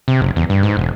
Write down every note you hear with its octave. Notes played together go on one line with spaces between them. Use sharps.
C3
F#1
E2
G2
G#2
E1